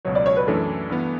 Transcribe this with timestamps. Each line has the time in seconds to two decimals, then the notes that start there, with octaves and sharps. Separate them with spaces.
0.05 C#2 B2 F#3 C#5
0.15 D5
0.26 C#5
0.36 B4
0.47 F#2 E3 A3 D4 A4
0.90 G2 E3 B3